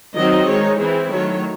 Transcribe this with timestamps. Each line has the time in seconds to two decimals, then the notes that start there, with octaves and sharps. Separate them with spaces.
0.15 D#3 F#3 C4 D#4 D#5
0.47 D#3 G#3 D#4 C#5
0.79 E3 C4 E4 G#4
1.10 D#3 F#3 A3 C#5